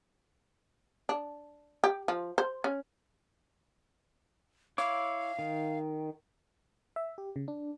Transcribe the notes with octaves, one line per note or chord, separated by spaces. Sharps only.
D4
G4
F3
C5
C#4
E4 C#5 F5 D6
D#3
E5
G4
C#3
D4